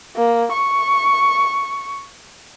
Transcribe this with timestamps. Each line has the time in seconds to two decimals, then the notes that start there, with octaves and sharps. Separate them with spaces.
0.16 A#3
0.53 C#6